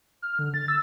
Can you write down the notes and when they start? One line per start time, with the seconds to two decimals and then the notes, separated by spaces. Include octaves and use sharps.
0.22 F6
0.39 D3
0.54 A6
0.68 E6